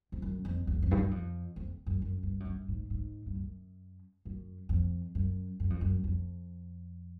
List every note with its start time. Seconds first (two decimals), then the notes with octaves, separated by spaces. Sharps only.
0.12 F2
0.22 F#2
0.45 F2
0.67 E2
0.82 F2
0.91 G2
0.97 F#2
1.11 F2
1.56 F2
1.86 F#2
2.02 F#2
2.23 G2
2.40 F#2
2.45 G2
2.68 G#2
2.90 G#2
3.26 G2
3.35 F#2
4.25 F#2
4.69 F2
5.15 F#2
5.60 F#2
5.70 F2
5.81 F#2
6.04 F2